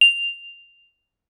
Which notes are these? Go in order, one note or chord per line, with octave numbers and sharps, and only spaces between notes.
F7